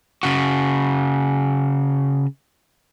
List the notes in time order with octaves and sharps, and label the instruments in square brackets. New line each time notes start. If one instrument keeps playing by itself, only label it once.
[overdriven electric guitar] C#3 F#4